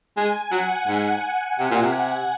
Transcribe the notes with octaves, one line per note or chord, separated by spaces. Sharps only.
G#3 G#5
F#3 F#5
G#2
C3
A#2
C3